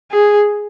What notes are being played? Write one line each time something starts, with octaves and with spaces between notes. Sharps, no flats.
G#4